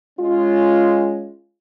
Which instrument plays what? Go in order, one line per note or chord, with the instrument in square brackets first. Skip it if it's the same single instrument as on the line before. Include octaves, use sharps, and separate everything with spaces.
[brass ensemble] G#3 C#4 F4